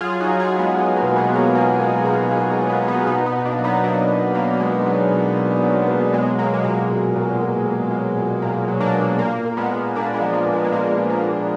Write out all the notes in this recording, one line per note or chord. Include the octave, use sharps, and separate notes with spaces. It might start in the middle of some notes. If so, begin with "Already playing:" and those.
F#3 F4 G#4
D#4 F#4
F#3
F4 G#4
F#3
G#3 B3
F#3 G#3
A#3
B2
G#3 B3
F#3
A#3
F#3 A#3
B2 G#3
B2 A#3
B2 G#3
A#3
F#3
G#3 B3
B2
B3 D#4
B2 B3 D#4
B3 D#4
B2
A#3 D4
F#3
B3 D#4
F#3 A#3 D4
B2
F#3 A#3
B2 G#3
F#3
B2
B2
F#3
B2
F#3 G#3
F#3 A#3
G#3
A#2 A#3
A#2
A#2
A#2
A#2
F#3
A#2
A#2 A#3
F#3
A#3 D4
F#3
A#2 A#3
A#2
G#3 B3
A#2
A#2 A#3 D4
G#3 B3
F3
A#3
A#2
G#3
G#3
A#2 A#3
F3
A#3
A#2